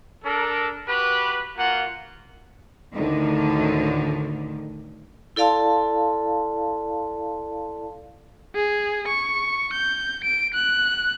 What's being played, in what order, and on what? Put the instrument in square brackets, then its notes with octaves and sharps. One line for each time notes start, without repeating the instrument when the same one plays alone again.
[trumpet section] D4 A4 A#4
F#4 G4 B4
A#3 F4 F#4 F#5
[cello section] D2 A2 D3 D#3
[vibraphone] E4 A4 D5 F5 A5 C6
[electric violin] G#4
C#6
G6
D7
F#6